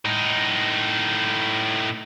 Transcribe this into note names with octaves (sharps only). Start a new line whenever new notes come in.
A2 D#4